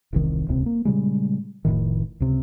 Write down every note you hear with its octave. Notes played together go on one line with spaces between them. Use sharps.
E1 C2 D#3
D#1 C#2 C3 C4
A#3
A#2 C#3 G3 G#3
F1 A2 D#3
C#2 C3